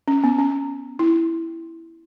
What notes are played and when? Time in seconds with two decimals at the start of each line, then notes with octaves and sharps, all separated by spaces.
0.08 C#4
0.24 B3
0.39 C#4
0.99 E4